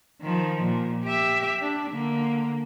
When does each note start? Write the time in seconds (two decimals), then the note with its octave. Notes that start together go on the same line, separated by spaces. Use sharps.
0.22 D#3 F3
0.64 A#2
1.04 G4 E5
1.61 D4
1.91 D3 A#3